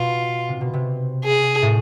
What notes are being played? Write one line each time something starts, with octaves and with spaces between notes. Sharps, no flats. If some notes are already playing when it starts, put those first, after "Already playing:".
Already playing: B2 F4
C3
B2
C3
G#4
A2